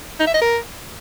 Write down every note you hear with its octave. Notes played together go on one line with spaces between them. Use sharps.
D#4
E5
D#5
A#4